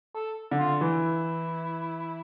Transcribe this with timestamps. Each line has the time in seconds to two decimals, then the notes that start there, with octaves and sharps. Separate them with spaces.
0.15 A4
0.51 D3
0.59 F4
0.81 E3 E4